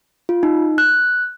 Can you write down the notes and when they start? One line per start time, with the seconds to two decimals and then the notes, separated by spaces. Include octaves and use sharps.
0.29 F4
0.43 D#4
0.78 F#6